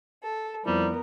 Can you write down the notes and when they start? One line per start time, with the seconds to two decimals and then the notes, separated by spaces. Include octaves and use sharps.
0.23 A4
0.66 F2 F3 G3 B3 E4 A#4